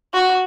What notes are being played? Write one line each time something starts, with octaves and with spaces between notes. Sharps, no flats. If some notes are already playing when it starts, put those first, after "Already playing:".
F#4